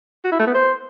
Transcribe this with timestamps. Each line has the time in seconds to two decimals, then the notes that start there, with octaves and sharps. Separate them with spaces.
0.24 F#4
0.32 E4
0.39 A3
0.47 B3
0.54 C5